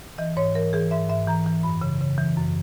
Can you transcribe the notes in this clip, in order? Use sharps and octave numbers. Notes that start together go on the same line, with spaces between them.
E3 D#5
G#2 C#5
E3 A#4
E3 G#4
G#2 E5
G#2 E5
E3 A#5
E3
F#2 B5
C#3
C#3
E3
F#2